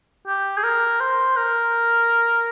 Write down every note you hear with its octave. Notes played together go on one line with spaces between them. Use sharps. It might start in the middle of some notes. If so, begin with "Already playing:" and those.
G4
G#4
A#4
C5
A#4